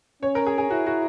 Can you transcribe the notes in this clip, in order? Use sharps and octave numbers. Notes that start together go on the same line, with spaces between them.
C#4 C#5
A#4
G#4
G#4
E4 F#4
F#4